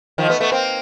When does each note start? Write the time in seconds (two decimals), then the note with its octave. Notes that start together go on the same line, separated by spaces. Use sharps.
0.18 D#3 F3
0.29 A3 B3
0.40 A3 B3
0.52 A#3 C4